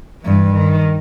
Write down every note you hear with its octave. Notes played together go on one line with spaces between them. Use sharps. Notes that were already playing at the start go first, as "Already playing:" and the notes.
G2 E3
D#3